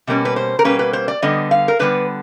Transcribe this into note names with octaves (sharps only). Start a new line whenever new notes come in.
B2 G3 A#3 C#4
B4
C5
A#4
B2 G3 A#3 C#4 B4
B4
C5
D5
D3 G3 B3 D#5
F5
A#4
D3 G3 B3 B4